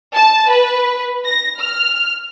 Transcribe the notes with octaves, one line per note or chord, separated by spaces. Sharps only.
A5
B4
A#6
F6